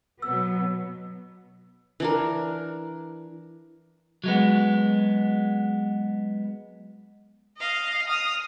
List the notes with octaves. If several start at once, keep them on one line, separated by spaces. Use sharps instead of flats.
B2 F#3 B3 E6
E3 D4 A#4
F#3 G#3 B3
D#5 F5
D#6 F6